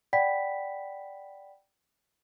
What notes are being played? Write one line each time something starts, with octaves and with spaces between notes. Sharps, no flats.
D5 F#5 G5 B5 B6